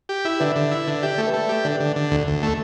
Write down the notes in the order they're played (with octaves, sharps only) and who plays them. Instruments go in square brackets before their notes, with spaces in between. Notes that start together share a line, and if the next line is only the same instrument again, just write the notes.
[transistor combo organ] G4
E4
[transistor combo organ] D3 [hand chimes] B4 E5
[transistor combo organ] D3
E4
D3
[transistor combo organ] G4 [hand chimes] E5
[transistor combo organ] A3 [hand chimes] D5
[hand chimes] B4 E5
[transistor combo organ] A3
G4
[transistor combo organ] D3 [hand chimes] A4 D5
[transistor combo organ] D3
D3
D2
D2
A3